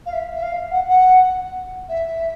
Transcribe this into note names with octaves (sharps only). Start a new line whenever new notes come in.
F5
E5
E5
F5
F#5
F#5
E5